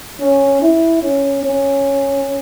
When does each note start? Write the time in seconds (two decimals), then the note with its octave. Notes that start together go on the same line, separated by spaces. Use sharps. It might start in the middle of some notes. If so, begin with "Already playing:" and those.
0.21 C#4
0.62 E4
1.03 C#4
1.43 C#4